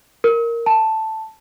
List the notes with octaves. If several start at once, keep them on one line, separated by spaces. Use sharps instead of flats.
A#4
A5